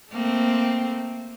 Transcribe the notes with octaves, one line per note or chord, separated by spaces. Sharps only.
A3 A#3 C4